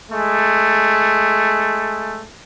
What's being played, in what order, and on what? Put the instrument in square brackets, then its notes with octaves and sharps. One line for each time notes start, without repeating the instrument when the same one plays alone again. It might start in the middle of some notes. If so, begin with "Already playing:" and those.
[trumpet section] G#3 A3